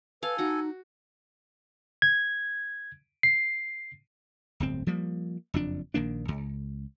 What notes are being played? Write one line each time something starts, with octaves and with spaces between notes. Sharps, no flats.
A4 B4 F5 G#5
D#4 F#4 F#5
G#6
C7
D1 G1 C4
F3 G3 A#3
F#1 F2 D4
A#1 D#3 A#3 D4
C#2